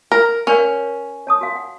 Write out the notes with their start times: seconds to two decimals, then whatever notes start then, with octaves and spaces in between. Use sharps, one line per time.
0.12 A#4
0.47 C#4 A#4 D5 F5
1.27 C#5 A5 D#6
1.41 F#4 F5
1.56 F#5